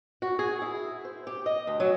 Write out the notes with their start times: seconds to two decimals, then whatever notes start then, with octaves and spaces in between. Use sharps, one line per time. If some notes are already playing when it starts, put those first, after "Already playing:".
0.22 F#4
0.39 G#4
0.62 E4
1.05 C5
1.27 G4
1.46 D#5
1.67 D2
1.80 F#3